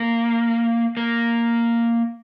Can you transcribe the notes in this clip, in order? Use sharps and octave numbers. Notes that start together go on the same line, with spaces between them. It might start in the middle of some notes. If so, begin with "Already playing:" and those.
Already playing: A#3
A#3